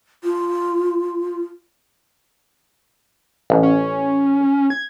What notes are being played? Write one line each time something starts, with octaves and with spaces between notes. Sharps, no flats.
F4
A1
C#4
G#6